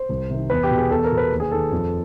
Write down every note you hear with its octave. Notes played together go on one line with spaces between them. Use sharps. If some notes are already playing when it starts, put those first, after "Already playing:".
Already playing: C5
C2
C3 D#3
E2 B4
G4
B2
G#4
E2 A4
A#4
B2
B4
D#2
G#4
D#3 A4
F2